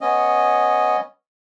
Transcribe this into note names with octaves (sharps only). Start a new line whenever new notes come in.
B3 C#4 D#5